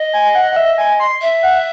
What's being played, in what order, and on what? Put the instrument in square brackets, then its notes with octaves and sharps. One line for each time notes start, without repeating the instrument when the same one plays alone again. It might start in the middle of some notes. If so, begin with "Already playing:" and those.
Already playing: [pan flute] D#5
[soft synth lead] G#5
F#5
F#5
E5
G#5
C6
[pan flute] E5
[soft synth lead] F#5